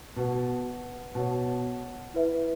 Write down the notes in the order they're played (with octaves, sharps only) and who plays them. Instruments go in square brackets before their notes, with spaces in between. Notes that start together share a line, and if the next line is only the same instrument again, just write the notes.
[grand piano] B2 [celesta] B4 F#5 A5
[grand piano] B2 [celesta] C#5 F#5 A5
[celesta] E4 B4 E5